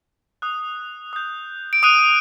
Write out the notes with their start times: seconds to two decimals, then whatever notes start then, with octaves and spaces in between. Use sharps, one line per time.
0.42 D#6 F#6
1.13 D#6 G6
1.73 D7
1.83 D#6 F#6 D#7